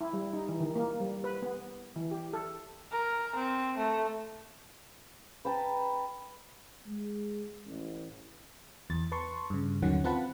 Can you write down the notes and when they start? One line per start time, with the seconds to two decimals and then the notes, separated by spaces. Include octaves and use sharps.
0.01 E4
0.13 G3
0.33 D#4
0.49 E3
0.60 D#3
0.76 A#3
1.00 G3
1.24 B4
1.42 B3
1.96 E3
2.11 G4
2.33 A4
2.91 A#4
3.36 C4
3.77 A3
5.45 B4 G5 A5 A#5
6.86 G#3
7.65 A1
8.90 E2 A6
9.12 B4 A5 C6 C#6
9.50 G2 C#3
9.82 D#2 D3 D#3 F#3 C#4 F#5
10.04 C4 F4 B4 F#5 A5 B5